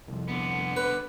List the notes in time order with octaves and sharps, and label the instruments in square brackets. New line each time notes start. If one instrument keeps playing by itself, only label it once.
[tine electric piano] C2 F2
[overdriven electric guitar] D3 B3
[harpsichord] B4